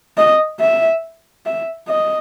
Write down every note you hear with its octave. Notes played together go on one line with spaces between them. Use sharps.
D#5
E5
E5
D#5